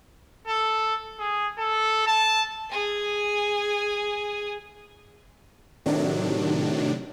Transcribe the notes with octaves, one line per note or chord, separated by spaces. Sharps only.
A4
G#4
A4
A5
G#4 G#5
A2 C3 D#3 F#3 D4